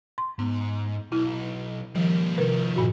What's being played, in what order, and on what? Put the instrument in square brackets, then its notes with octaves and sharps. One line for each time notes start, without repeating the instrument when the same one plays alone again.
[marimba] C6
[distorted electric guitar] G#2 [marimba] B3
[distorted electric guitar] B1 [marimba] E4 F6
[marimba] D#3 F3 [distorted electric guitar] G3 A#3
[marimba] C3 A#4 B4 [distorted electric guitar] D#3 F3
[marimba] G2 A#2 F#4